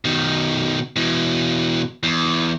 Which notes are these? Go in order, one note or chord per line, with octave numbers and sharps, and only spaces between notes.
B2 D#3
B2 E3
E2